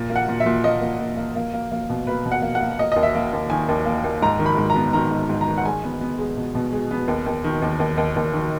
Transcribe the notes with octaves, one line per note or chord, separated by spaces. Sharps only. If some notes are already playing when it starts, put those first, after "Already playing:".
Already playing: A#2
A#3
F#5
A#2
E5
A#2
A#3 D#5
A#2
A#2
A#3
A#3
A#3
A#3
B2
A#3 B4
B2
F#5
A#3
F#5
A#3
A#3 D#5
D#2 D#5
E5
A#3
D#2
D#3 G#5
D#2
A#3
D#2
G#2 A#5
D#3
B5
G#2
A#5
B3
D#3 A#5
G#2
G#2
A#5
D#3
F#5
G#3 G#5
B3
B3
G#3
B2
B2
G#3
B3
D#2
D#2
D#3
D#2
D#2
D#2
D#2
D#3